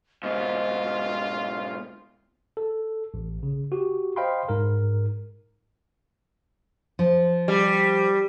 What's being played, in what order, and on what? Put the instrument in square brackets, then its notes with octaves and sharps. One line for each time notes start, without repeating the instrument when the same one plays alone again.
[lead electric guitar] G#2 B2 [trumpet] F4 [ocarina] D#5
[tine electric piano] A4
A1
C#3
F#4 G4
C5 D#5 F5 G5 B5 C6
G#2 A#4
[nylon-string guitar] F3
[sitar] G3